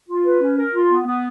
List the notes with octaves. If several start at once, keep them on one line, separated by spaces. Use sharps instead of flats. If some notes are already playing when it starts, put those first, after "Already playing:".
F4
B4
C#4
A#4
F4
B3
B3